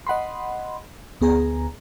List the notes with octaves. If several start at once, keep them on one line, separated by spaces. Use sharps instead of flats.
D#5 F#5 B5 C6
D2 B3 G#4 A#5